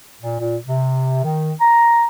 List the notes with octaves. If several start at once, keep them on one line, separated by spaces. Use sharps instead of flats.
A#2
A#2
C3
D#3
A#5